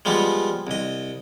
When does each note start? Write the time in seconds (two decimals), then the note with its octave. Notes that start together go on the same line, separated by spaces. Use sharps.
0.05 F3 G3 G#3 B3 F4
0.67 C2 D#5